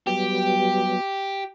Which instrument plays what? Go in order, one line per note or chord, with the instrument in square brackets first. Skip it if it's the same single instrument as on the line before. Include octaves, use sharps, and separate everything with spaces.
[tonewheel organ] F#3 G3 B3 [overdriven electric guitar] G4